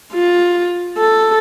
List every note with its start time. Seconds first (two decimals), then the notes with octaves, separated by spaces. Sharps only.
0.14 F4
0.97 A4